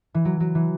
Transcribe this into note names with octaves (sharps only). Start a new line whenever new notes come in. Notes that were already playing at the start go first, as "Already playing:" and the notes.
E3
F#3
F#3
E3